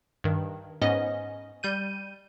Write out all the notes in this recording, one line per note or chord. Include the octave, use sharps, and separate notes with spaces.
G2 D#3
G#2 B3 C#4 D#5
G3 G6 D#7